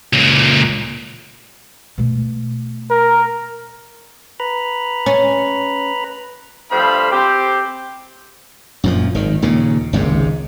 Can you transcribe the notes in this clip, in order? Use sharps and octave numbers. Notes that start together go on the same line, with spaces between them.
C#2 A#2
B2 A3
A#4
B4 A#5 B5
C#4
G2 F3 A3 C5 F5 B5
C4 G4 C5
F#2 A#2 F3
G#1 D#3
D#2 A#2 C#3
G#1 C#2 G#2 C3